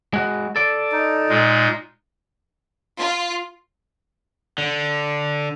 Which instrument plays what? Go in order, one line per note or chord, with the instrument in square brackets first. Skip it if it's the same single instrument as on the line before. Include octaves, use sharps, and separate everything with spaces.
[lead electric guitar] G#3 F#4
A4 D5
[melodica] D#4
[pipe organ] A#2 G#3
[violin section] F4
[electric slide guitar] D3